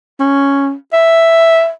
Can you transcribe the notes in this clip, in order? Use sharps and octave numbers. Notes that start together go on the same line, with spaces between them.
C#4
E5